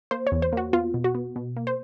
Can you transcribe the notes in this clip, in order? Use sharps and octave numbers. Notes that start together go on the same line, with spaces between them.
A#3 C5
C#5
E2
C5
A#3 F#4
B3 F4
B2
F#4
B3
B2
A#3
C5